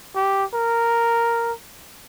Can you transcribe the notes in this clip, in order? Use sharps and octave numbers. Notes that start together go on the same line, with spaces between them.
G4
A#4